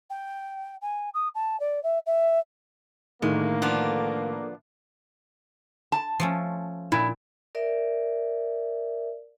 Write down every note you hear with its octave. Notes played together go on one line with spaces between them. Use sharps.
G5
G#5
D#6
A5
D5
E5
E5
A2 D3 D#3 G#3 A#3
F3 B3 D4
A5
F3 A3 C#4
A#2 E4
A#4 D5 E5